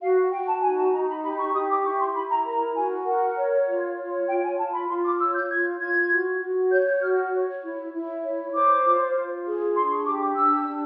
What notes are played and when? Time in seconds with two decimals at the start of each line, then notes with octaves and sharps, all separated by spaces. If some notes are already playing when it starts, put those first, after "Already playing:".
0.02 F#4 F5
0.31 F#4 G5
0.47 A5
0.62 D#4 G#5
0.78 A5
0.93 D#4 A#5
1.08 B5
1.23 G4 B5
1.38 C#6
1.54 G4 D#6
1.69 D6
1.84 E4 C#6
1.99 C6
2.15 E4 B5
2.30 A#5
2.45 A#4 A#5
2.75 F#4 G#5
3.05 A#4 F#5
3.36 C#5
3.67 F4
3.97 C#5
4.28 F4 G5
4.43 G#5
4.58 F4 A5
4.74 B5
4.89 F4 C6
5.04 D6
5.20 C#5 E6
5.35 G6
5.49 F4 G#6
5.80 F4 G#6
6.10 F#4
6.41 F#4
6.71 C#5 G6
6.87 G6
7.02 F#4 F6
7.33 C#5
7.63 E4
7.94 E4
8.24 C#5
8.54 C5 D6
8.85 F4
9.15 F4
9.46 G#4
9.76 D4 C6
9.91 C#6
10.06 G4 D6
10.21 D6
10.36 D4 E6
10.67 D4